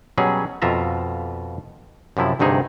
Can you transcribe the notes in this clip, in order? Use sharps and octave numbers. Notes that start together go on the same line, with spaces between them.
B2 F#3 G3 C#4 G#4
F2 B2 F4 E5 A#5
F#2 C3 F3 E4
D2 G2 C3 D#4 G#4